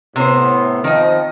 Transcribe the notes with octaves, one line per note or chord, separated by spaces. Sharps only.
A2 C3 B3 C5
D#3 F3 C4 D#5